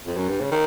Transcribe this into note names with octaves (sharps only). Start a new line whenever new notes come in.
F2
F#2
G2
C#3
D#3